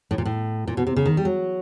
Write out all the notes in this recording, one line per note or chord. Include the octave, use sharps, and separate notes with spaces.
A2
A#2
A2
A#2
B2
C3
C#3
D#3
G3
F#3